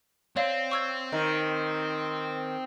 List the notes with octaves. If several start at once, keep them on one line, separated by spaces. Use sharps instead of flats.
C4 C#5 D5 F5
C#6 E6 G#6
D#3